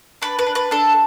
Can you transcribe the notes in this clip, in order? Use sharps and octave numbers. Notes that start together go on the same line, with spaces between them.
D4 B4
B4
D4
B4
D4 A4